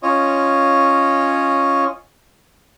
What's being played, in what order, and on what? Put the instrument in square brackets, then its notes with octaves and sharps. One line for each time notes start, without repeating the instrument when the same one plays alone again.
[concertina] C#4 F4 C#5 D#5